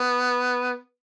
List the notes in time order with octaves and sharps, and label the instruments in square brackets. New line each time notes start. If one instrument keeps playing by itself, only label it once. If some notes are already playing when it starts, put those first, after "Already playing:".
Already playing: [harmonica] B3